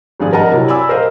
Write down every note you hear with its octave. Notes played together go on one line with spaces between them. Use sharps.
G#1 G2 F3 G#4 D5
A#4 D#5 F#5 A5 A#5
C3 F#3 E4
D5 G#5 B5 D6 E6
A#4 C5 D#5 F5